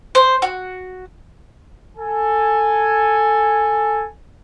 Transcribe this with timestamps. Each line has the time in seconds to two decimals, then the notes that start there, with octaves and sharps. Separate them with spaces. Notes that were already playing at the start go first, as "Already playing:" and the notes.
0.15 C5
0.42 F#4
1.97 A4 G#5